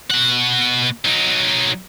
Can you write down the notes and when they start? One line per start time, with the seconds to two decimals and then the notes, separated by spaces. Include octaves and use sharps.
0.11 B2 F#5
1.05 F#3 D#4